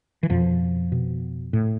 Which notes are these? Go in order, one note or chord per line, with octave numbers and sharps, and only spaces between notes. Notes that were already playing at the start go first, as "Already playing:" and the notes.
E3
F2 B2 F3
B2
A2